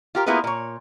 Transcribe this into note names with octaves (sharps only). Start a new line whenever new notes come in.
F4 G4 A#4
A#3 B3 E4 F4 G#4 B4
A#2 C#5